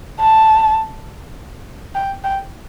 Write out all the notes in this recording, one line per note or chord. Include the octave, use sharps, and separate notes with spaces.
A5
G5
G5